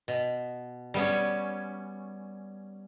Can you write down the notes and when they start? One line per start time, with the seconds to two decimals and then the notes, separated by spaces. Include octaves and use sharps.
0.08 B2
0.94 G3 B3 C#4